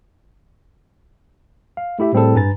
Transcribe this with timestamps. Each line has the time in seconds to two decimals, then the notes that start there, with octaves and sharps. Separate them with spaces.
1.77 F5
1.99 A3 E4 G4 E5
2.13 A2 G3 C4 E4 G#4 A4
2.35 G2 B4 G#5 A#5 A6